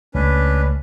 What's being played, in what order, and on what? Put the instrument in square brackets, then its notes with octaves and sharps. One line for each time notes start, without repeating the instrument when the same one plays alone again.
[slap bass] C#2 A3 [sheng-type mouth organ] C#4 D4 B4